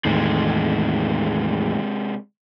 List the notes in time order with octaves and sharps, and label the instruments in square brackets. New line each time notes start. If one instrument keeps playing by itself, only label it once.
[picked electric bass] E2 A2 D#3 [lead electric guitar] C3 G#3